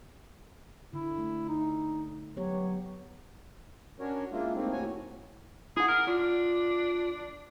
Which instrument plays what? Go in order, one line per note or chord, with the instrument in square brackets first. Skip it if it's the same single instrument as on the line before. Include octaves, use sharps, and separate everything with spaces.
[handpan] D3 [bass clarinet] E4
[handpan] A3
[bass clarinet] D#4
[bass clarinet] F#3 [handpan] B3 G4 C#5
[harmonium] C#4 D4 F#4 A#4 C#5
G#3 A#3 D4 E4 F4
A2 A3 A#3 C4 D#4
D#2 A2 F#4 C#5 G#5
[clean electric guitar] E4 F#5 [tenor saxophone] G#4
[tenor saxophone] A#4
[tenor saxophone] D4 [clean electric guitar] F4